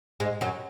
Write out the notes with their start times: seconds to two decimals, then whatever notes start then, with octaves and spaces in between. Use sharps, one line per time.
0.20 G#2 G#3
0.41 F#2 F#3